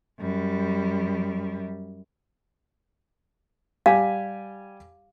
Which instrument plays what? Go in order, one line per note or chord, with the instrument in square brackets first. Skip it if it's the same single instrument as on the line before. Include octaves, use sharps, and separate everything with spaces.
[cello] F#2 G3
[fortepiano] G3 G4 G#5 [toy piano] F5